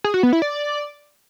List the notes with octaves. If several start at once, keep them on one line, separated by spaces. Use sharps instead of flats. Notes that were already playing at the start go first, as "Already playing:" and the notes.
G#4
F#4
B3
E4
D5